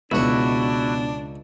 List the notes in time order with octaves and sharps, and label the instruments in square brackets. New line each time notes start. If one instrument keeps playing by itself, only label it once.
[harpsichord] C#2 C#5 [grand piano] B2 E3 [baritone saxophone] D4 [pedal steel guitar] E4 F#4